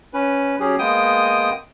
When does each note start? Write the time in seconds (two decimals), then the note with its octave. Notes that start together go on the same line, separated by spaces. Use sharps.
0.14 C#4 B4
0.60 F#3 C#4 G4 G#4
0.79 G#3 A#3 B3 G5 D#6